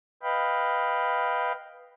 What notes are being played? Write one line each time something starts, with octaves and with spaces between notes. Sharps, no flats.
B4 D#5 F5 G5 B5